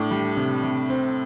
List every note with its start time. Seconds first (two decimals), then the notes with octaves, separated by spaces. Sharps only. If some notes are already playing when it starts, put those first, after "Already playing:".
Already playing: A2 D4
0.11 G3
0.37 C3
0.63 C3
0.90 C4